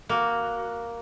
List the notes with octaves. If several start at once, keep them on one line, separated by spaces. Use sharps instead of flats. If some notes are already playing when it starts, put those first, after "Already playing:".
A#3 F#4